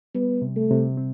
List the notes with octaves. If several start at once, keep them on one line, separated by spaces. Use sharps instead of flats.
G3 B3
C3
A3
C3
C4